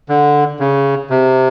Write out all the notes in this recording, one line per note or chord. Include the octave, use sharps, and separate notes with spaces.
D3
C#3
C3